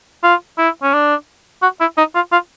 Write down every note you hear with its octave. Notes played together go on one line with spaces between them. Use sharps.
F4
E4
C#4
D4
F#4
E4
D#4
F4
F4